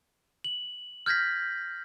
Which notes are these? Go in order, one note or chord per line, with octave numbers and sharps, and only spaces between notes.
F#7
F6 G6 G#6 A#6 B6